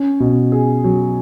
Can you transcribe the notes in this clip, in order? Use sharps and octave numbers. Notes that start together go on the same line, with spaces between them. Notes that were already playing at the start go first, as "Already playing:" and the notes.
Already playing: C#4
B2
G#4
F#3